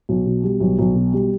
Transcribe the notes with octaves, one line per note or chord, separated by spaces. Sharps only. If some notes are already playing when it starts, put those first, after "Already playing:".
B1
B2
G3
B1
B1
B2
G3